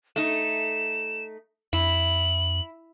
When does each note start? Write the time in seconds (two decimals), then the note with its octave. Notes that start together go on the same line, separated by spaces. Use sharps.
0.16 A3 D#4 E7
1.73 F2 E4 F#7